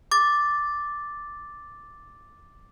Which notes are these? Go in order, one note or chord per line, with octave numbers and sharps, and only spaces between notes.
D6 A6